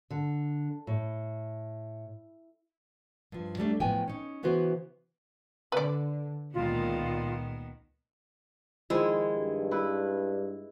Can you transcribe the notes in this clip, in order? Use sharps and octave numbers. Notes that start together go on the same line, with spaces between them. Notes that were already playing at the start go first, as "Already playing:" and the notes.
D3
A2
G2 F3
F#3 G3 A3 D4
A2 F3 F#3 B3 G5 G#5
C#4 D#4
C#3 E3 B3 F#4 C5
D3 B4 D5
C#2 A#2 D#3 B3 F4
D#3 F3 G#3 E4
G2
E4 B4